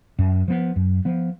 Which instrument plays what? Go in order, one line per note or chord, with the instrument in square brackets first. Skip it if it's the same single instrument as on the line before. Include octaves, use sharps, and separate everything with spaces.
[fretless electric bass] F#2
F3 B3
F#2
F3 B3